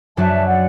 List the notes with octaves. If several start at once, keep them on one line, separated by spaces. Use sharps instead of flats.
F#2 F#3 D4 F#4 E5 A5
D5 F#5